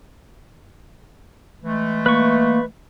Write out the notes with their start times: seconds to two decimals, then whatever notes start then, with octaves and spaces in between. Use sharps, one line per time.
1.63 E3 G#3 A3
2.06 A#3 B4 C#6